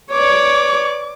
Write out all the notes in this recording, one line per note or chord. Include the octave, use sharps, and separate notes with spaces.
B4 C#5 D5 D6